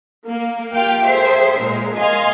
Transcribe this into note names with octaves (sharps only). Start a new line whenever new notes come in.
A#3
F4 G4 F5 G5
G#4 A4 C5 E5
A#2 G#3 A#4
D#5 F5 G#5 C6